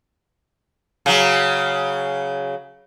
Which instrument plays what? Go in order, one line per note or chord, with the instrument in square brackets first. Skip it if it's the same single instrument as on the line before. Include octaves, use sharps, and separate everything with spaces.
[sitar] C#3 F#3